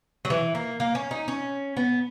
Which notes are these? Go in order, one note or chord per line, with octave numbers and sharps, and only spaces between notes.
F#3
E3
A#3
A#3
C#4
D#4
C#4
B3